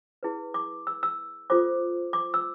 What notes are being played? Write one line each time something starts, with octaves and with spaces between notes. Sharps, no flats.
E4 G#4 B4
D6
E6
E6
F4 A4 C5 D6
D6
E6